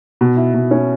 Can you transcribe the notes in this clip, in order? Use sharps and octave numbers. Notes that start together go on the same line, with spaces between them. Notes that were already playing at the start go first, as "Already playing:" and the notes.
B2
E4
B2
C#4